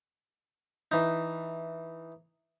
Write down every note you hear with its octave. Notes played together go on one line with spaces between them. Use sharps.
E3 D#4